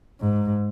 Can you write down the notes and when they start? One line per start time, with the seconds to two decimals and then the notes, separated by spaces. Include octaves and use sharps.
0.20 G#2